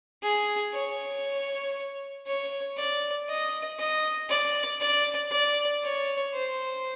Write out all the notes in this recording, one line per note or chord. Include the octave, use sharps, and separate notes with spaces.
G#4
C#5
C#5
D5
D#5
D#5
D5
D5
D5
C#5
C5